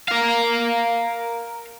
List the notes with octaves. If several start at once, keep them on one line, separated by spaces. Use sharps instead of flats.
A#4 F5